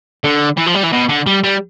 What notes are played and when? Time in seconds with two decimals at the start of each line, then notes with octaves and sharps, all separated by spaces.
0.24 D3
0.58 E3
0.67 F3
0.75 G3
0.84 E3
0.92 B2
1.09 D3
1.27 G3
1.44 G3